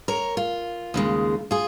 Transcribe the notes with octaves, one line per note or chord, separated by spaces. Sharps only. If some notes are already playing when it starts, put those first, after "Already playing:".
A#4 C#5
F4
D#2 C#3 G#3
F4 G#4